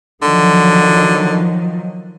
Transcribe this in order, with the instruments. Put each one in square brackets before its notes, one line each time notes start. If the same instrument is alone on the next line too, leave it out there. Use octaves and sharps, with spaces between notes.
[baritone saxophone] D3 [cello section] D#3 F3 F#3